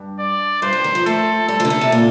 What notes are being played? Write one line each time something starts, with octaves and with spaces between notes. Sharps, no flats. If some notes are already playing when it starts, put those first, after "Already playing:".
Already playing: G2
D5
G2 C5
G2
D#3
F3
A3 A4
G3 A4
F3
D3
D#3
C3
A#2